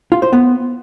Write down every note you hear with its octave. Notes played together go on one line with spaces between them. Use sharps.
F4
C5
B3